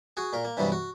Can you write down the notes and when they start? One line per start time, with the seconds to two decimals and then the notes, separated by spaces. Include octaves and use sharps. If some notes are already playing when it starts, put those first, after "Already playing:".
0.17 F#4 G#4
0.33 A#2 A#4
0.45 A#3
0.57 G2 C3 E3 F#3 G3 B3
0.72 F#4